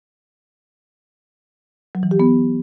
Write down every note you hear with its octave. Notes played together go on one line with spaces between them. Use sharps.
F#3
E3
G4
B3